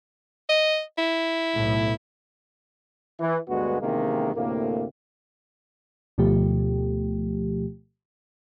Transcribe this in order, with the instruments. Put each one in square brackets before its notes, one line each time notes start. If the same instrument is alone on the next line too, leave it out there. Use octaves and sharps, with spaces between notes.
[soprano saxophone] D#5
E4
[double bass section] B1 A2
[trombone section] E3
D2 G2 G#3 B3 F#4
A1 C3 D#3 G#3 A#3
D2 A2 C3 A#3
[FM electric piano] D2 B2 F3 A3 G4